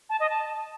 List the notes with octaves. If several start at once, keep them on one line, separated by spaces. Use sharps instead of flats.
A5
D#5
A5